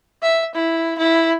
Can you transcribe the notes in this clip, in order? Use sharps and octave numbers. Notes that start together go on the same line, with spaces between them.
E5
E4
E4